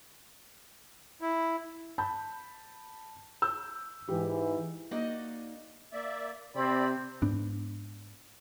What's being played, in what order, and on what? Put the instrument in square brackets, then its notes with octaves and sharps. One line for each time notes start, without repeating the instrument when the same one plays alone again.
[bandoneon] E4
[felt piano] A5 B5 G6
E6 G6
[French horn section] G#2 E3 [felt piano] G4
[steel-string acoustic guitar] A#3 D#4 F#4 D5 D#5
[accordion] A#3 D5 E5
[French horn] C3 [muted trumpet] C4 [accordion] D5 B5
[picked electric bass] G#2 B3 D4